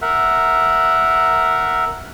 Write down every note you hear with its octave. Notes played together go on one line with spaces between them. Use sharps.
A#4 E5 F#5